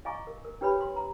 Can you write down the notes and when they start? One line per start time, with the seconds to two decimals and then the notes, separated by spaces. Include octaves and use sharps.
0.05 D#5 F5 G#5 A#5 C#6 D6
0.27 A#4
0.45 A#4
0.61 D4 G4 B4 C#5 B5
0.81 C6
0.96 A#5